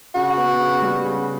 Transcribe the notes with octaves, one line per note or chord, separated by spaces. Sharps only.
C#3 F#4
B3
C#3
G3
C#3